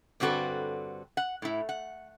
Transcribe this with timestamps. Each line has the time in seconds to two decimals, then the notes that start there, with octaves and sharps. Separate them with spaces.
0.20 G2 D3 C4 F#4 A4 B4
1.17 F#5
1.42 A2 E4
1.69 F#5